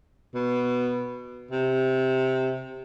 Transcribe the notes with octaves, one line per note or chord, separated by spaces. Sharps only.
B2
C3